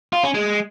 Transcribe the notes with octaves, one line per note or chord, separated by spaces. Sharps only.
F4
C#4
G#3